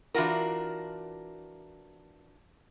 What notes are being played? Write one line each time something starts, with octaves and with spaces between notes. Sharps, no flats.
E3 D4 F4 F#4 A#4